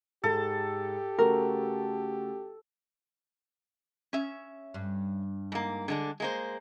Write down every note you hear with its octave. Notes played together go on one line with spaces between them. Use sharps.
G#2 G4 A4
C#3 A3 F#4 A#4
C#4 E5
G2
G#2 A#3
D3 G#3 D4
G#3 A#3 C5